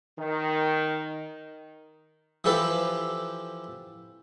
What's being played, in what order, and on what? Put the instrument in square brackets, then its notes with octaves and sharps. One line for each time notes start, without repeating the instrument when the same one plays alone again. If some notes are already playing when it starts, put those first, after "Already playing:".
[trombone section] D#3
[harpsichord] E3 F3 G4 A4 B4